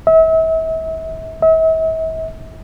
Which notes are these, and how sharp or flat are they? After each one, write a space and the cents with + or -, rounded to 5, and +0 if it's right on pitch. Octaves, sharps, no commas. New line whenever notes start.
E5 -40
E5 -45